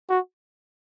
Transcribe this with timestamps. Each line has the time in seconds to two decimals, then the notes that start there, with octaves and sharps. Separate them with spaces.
0.09 F#4